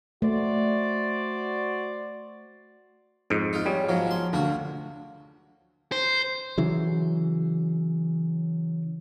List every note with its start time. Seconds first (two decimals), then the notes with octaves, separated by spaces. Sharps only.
0.22 A3 F#4 C5 D5
3.30 F2 G#2 D7
3.53 D#4 F4
3.66 G3 G#4 C#5
3.89 G#2 F3 F#3 G#3
4.07 F3 C6
4.33 D2 D3 A#3 F#4
5.92 C5
6.58 C#3 E3 F#3